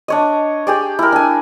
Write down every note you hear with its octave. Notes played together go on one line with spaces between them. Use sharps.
D4 C#5 D#5
G4 G#4 D5
E4 A#4
D4 G#5